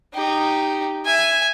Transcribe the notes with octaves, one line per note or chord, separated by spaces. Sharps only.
D#4 G4
E5 G#5